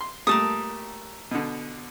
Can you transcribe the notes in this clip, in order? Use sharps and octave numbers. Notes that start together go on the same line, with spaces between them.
C6
A#2 G3 A3 A#4 A5 D#6
B2 D3